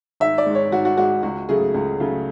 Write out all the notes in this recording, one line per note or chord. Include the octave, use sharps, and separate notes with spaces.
G#1 E5
D5
G#2 G#3
C#5
G#1 F#4
F#4
G#2 G#3 F#4
C#2 F#4
C#3 F#3 A3 G#4
C#2
C#3 F#3 A3